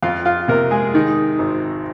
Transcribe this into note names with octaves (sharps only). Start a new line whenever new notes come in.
F2 F4 F5
F4 F5
C3 A#3 A#4
G#3 G#4
D#3 G#3 D#4
G#1